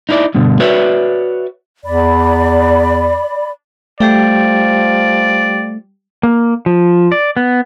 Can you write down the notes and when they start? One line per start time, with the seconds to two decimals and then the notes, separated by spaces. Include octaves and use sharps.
0.09 D#4 E4 A4 D5
0.35 G2 B2 D3
0.60 F#4 B4 C#5 D5 E5
1.86 E2 D5 B5
4.00 F3 G3 A3 G4 D5 G5
6.23 A#3
6.66 F3
7.12 D5
7.37 B3